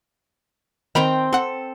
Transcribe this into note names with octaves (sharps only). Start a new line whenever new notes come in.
D#3 C4 G5 A#5 B5
C4 A4 F#5